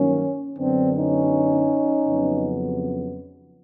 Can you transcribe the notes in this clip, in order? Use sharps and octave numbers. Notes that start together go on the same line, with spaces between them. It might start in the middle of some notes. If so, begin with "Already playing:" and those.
Already playing: G2 D#3 F#3 A#3 C#4
F#2 D3 F#3 B3 C4 D4
C#4 D#4
F2 C#3 F#3 B3